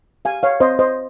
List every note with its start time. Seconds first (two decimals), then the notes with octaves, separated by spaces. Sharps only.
0.25 G4 F5 G#5
0.43 C#5 F5
0.60 C4 C5 D#5
0.79 C5 D#5